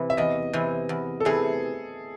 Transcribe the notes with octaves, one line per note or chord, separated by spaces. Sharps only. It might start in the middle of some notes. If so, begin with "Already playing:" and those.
Already playing: C3 E3
E5
E2 D#5
C3 E3
E2
A4
C3 E3 G#4